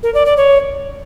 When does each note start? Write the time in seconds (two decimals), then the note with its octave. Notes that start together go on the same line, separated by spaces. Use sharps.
0.03 A#4
0.14 D5
0.25 D5
0.37 C#5